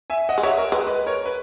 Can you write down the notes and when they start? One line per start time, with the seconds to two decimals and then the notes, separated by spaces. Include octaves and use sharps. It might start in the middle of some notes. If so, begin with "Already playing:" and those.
0.10 E5 G#5
0.29 D#5 F#5
0.38 G#3
0.43 F#3 C#5 E5
0.58 A#4
0.72 G#3 B4
0.87 B4
1.06 A#4 C#5
1.26 B4